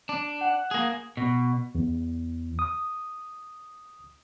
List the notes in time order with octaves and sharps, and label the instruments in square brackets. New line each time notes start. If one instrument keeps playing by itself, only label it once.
[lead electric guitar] D4
[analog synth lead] F#5
[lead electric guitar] A#3 G#4
B2
[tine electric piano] E2
D#6